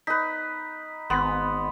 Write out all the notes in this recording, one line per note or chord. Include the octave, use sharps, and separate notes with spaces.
D#4 B4 B6
G#1 B3 C6